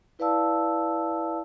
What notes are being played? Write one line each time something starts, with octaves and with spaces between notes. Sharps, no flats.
E4 B4 D5 F5 A5 E6